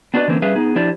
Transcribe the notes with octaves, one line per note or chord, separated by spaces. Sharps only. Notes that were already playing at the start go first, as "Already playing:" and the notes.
B3 D4 F#4 B4 D5 D#5
D3 E3 A#3 C4 C#4
G3 C#4 G#4 B4 E5 F5
B3 D#4 G#4
F3 D4 E4 G4 C5 D5